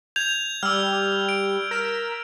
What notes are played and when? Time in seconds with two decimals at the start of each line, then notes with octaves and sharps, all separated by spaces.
0.16 G6 G#6 F7
0.63 G3 E6 F6
1.29 D7
1.71 A#4 B6 E7